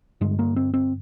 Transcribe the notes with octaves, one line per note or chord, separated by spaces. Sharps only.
G2 D3 G#3
A#3
C4
C4